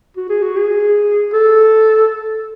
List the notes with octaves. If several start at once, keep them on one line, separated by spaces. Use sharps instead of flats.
F#4
G#4
F#4
G#4
A4